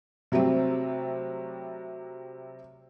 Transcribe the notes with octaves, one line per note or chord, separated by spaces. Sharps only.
C3 F#3 G3 A3 C4